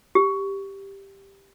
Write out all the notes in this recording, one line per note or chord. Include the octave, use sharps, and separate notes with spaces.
G4